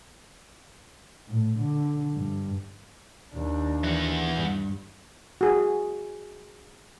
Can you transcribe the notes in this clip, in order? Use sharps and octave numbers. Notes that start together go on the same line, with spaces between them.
A2
D3
G2
D#2 D4
E3 F#5
G2
F#4 G#4